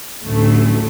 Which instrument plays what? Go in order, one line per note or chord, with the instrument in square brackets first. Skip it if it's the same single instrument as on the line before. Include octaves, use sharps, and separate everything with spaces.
[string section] A1 D2 F#3 A3